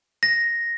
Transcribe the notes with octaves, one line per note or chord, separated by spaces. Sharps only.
A#6